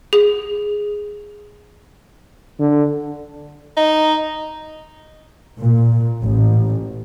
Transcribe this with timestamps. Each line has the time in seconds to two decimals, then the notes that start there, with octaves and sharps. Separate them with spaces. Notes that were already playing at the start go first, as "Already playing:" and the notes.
0.13 G#4
2.60 D3
3.77 D#4
5.61 A#2
6.23 A1